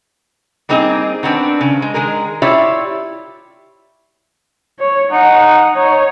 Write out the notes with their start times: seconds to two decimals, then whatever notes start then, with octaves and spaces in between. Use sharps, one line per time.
0.69 G3 A#3 C4 D#4 G#4
1.23 D#3 B3 C4 D4
1.61 C#3
1.82 G#3
1.94 D#3 G#3 G#4 A#4
2.42 E4 F4 G4 C#5 D5 E5
4.80 C#5
5.11 D#4 F#5
5.75 D#4 C#5